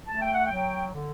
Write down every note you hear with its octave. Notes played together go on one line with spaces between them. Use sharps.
A3 A5
G5
F#5
G5
F#3
D3